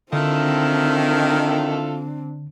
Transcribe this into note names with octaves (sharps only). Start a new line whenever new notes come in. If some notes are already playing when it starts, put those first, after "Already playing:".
D3 D#3 C4 D4 E4 F4 A4